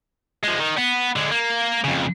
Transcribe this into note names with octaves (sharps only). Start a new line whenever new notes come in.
F3 G#3
D#3
B3
D3 G#3
A#3
F2 C#3